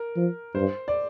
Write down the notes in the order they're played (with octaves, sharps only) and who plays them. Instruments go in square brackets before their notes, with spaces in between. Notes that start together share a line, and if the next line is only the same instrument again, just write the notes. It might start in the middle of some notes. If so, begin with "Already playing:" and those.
Already playing: [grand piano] A#4
[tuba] F3
[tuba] G2 [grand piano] C5
[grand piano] D5